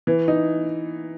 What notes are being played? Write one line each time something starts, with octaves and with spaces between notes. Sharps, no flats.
E3
D#4